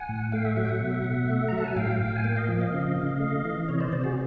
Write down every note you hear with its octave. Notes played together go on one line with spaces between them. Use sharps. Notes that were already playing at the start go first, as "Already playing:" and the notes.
Already playing: F#5 G#5
A2
A3 F5 G5
E5 F#5
F#3 E5 F#5
G5
E5 F#5
B2
B2
A3
F#3 A#5
A5
G#5
A2 F5 G5
A2 F5 G5
G#5
A#3 F5 G5
D#5 F5
F3
D#5 F5
C#3
C#3
A3
E3
C3 C#5 D#5
C5 D5
C3 C5 D5
F#4 G#4